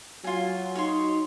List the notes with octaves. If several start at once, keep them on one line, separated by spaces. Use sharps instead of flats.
F#3 F4 G#5
D#4 C#5 C6